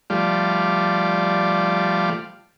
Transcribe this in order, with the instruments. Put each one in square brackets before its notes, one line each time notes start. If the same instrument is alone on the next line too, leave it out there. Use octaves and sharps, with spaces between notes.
[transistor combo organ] F3 G3 A3 F4 D5